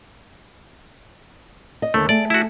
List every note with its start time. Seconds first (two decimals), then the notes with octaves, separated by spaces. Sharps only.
1.82 D#5
1.94 D#2 D3 A3
2.09 A3 G#4 D5
2.30 E4 F#4